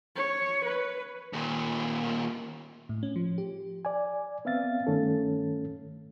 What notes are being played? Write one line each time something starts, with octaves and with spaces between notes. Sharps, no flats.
C#5
B4
D#2 A#2
A2
C#4
F3
G4
D5 G#5
B3 C4 E5 F5 A6
G2 D#3 A3 C#4 A4